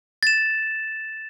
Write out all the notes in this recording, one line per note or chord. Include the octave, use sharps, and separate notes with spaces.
A6 E7